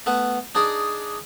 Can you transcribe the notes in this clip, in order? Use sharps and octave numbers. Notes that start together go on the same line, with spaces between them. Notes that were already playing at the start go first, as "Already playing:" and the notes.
A3 B3 B4
D4 D#4 G#4 D5